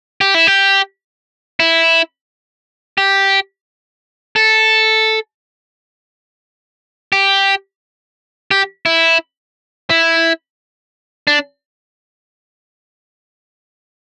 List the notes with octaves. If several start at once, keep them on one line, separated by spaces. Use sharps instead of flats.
G4
E4
G4
E4
G4
A4
G4
G4
E4
E4
D4